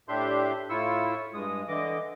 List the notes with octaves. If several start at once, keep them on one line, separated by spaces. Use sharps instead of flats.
A2 D4 G4 E5 C6 G6
A2 E4 F4 C#6 E6
G2 G#3 D#6
D3 E3 D#5 D6